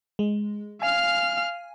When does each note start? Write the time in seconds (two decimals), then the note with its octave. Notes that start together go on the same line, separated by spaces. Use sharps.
0.19 G#3
0.82 F5 G#5 F6